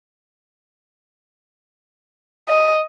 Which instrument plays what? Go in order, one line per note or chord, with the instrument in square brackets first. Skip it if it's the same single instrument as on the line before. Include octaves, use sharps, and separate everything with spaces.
[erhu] D#5